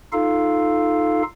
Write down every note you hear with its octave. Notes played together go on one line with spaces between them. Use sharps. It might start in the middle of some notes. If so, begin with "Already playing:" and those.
D#4 F4 A4 F5